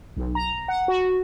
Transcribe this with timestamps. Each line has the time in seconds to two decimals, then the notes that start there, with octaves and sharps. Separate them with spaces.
0.16 B1
0.35 A#5
0.68 F#5
0.88 F#4